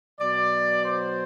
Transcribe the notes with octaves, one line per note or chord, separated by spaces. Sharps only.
B2 F#3 D5
C5